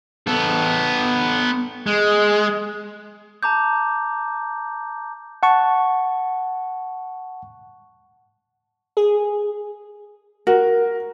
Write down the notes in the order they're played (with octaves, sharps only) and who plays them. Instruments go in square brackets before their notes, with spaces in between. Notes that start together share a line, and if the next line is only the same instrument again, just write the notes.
[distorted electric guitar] B3 A4
G#3
[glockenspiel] A5 A#5 D6 G6
[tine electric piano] F#5 A5 C#6
[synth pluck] G#4
[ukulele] F#4 [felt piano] A#4